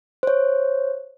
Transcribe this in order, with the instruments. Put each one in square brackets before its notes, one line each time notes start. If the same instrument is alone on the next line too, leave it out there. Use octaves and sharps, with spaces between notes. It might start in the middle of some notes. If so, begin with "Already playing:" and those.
[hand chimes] C5 C#5